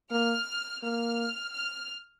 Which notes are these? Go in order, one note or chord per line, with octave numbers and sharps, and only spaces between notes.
A#3 F6
A#3 F6
F6